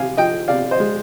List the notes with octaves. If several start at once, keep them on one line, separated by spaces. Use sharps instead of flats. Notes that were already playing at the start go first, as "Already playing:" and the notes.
Already playing: C3 F5 G#5
F3 D#5 G5
C3 D5 F5
C5 D#5
G#3